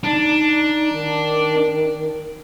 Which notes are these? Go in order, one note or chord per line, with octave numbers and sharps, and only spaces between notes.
D4 D#4
D#3